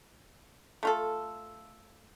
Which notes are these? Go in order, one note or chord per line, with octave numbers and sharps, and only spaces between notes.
A3 F4 A4